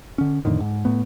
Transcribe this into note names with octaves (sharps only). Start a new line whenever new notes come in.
D3 C#4
F2 A2 D3 D#3
G#2
A2 A3 B3